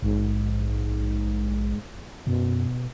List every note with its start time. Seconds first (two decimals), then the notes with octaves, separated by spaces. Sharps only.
0.03 A#1 G#2
2.27 F#2 B2